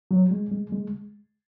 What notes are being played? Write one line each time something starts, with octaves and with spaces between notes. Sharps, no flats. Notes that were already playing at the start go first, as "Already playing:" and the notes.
F#3
G#3
G#3
G#3